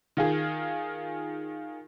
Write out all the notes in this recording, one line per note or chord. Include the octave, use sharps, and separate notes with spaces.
D#3 F4 G#4